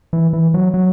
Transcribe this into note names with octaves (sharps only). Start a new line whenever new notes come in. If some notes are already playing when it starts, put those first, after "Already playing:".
E3
E3
F#3
F#3